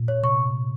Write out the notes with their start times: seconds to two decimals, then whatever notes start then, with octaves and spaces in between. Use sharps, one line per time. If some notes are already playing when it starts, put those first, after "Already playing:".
Already playing: A#2
0.08 C#5
0.23 C3 C#6